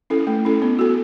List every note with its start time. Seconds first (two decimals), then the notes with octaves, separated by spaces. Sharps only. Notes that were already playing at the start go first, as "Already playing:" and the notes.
0.10 C#4 E4 A4
0.27 A3
0.45 C#4 E4 A4
0.62 B3
0.79 F#4 A4